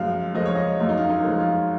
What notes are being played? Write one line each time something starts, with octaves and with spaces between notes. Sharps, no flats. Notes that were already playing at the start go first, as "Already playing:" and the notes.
Already playing: F#2 F3 G#3 F5
F3 G#3 D#5
C#5
D#5
F#2 F4
D#4
F4
D#4
F3 G#3
F4